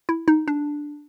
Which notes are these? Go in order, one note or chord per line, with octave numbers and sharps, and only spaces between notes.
E4
D#4
D4